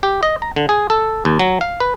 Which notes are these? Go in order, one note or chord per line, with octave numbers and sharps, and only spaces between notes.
G4
D#5
A#5
D3
G#4
A4
D#2
F#3
F5
B4